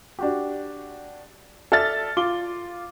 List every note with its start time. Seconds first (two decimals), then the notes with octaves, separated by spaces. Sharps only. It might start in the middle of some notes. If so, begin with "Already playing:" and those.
0.19 D4 F#4 G4
1.72 A4 D5 E5 F6 A6
2.17 F4 D6 G7